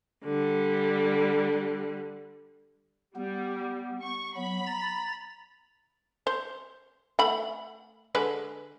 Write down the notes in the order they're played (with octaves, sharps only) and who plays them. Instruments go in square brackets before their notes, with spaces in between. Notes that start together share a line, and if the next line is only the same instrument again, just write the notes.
[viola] D3 G3
[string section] G3 [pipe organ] B3
[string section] C#6
[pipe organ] F#3 B3 [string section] B5
[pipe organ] A#5 A6
[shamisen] C5
A3 F#5 B5
D3 G#3 B4